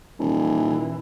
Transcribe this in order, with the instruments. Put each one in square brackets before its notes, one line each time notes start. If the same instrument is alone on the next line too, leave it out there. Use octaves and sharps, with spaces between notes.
[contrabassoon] D#1 [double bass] A#2 E3